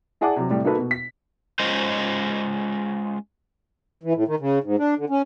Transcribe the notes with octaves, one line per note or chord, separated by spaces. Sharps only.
E4 G#4 D5 F#5 A5 D6
C3 F#3
A2 C3 G3
A#3 D#4 F#4 A4 B4
B2
B6
G#3 C#4 F4 C5 D#5
E3
A2
D#3
C#3
G#2
D4
D3
C#4